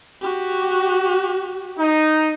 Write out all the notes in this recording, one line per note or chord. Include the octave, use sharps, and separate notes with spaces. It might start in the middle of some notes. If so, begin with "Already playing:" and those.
F#4 G4
D#4